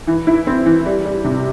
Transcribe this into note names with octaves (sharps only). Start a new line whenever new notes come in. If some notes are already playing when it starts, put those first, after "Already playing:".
E3
E4
C4
E3
G3
G3
C3